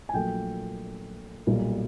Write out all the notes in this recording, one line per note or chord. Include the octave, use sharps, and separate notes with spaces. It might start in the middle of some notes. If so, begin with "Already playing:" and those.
G#5
A#1 A#2 F#3 A3 G5
B1 A#2 G3